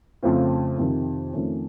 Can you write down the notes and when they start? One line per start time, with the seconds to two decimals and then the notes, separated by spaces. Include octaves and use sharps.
0.23 F2 C#3 A3 C4 F4
0.78 F2 C3 D#3
1.33 F2 D#3 A3 C#4